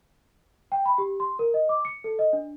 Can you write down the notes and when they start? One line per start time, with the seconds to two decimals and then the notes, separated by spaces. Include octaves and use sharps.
0.72 G5
0.86 B5
0.98 G4
1.20 C6
1.39 A#4
1.54 D#5
1.69 D6
1.85 C#7
2.04 A4
2.19 D#5
2.33 D4